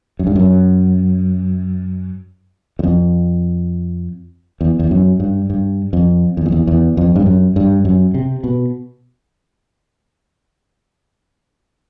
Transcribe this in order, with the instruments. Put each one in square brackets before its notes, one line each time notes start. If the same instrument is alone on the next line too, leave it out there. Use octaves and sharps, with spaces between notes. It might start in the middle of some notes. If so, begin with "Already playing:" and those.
[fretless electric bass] F#2
G2
F#2
E2
F2
E2
E2
F#2
G2
G2
F2
E2
F2
E2
E2
F2
G2
F#2
G2
F#2
C3
B2